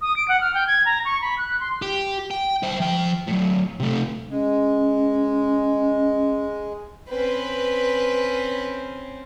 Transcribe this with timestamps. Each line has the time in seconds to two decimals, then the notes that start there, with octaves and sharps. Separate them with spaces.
0.01 D#6
0.16 D7
0.28 F#5
0.41 F6
0.54 G5
0.67 G#6
0.85 A#5
1.05 C#6
1.22 B5
1.38 F#6
1.60 C6
1.82 G4
2.31 G5
2.63 E4 C5
2.80 F3 G5
3.28 A2 F#3
3.80 C3 A3
4.31 G#3 C#4
7.10 C4 C#4 B4